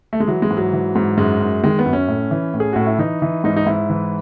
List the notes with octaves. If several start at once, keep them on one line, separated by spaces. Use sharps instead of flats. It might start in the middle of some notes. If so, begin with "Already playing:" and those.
A3
G#3
E3 F#3
G#3
G#2
F#3
E3
G#2
F#2 G#3
F#2
D#3 G#3
B3
F#2
C#4
A2
E3
A2
G#4
A2 F#4
E4
E3 D#4
E3
G#2 D#4
D#4
G#2 E4
E3